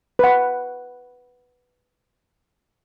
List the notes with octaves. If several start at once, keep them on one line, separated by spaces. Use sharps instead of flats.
B4 F#5